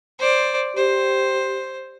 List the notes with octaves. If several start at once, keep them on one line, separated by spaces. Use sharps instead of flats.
C5 D5
G4 C5